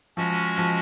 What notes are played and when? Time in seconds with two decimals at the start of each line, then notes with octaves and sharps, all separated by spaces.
0.17 F3 G#3 C#4 F#4
0.58 F3